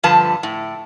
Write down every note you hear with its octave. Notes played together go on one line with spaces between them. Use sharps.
G2 D3 F3 B4 A5
A2